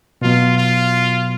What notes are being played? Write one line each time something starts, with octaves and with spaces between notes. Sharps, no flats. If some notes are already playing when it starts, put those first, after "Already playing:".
B2 F#3 B3 F4
F4